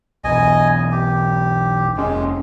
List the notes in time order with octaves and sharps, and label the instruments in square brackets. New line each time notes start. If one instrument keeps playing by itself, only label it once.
[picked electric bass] B1 E2 [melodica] D#5 G#5
[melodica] G4
[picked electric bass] F1 C#4 [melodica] G#3